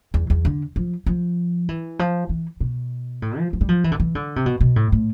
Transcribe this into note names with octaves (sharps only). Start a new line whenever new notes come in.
E2
E2
D3
F3
F3
E3
F3
E3
B2
A2
F3
F3
G3
F3
E3
D3
E3
D3
C3
B2
B2
A2
A2